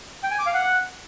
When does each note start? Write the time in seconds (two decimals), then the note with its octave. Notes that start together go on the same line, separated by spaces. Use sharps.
0.23 G5
0.31 G#5
0.39 D6
0.46 F5
0.54 F#5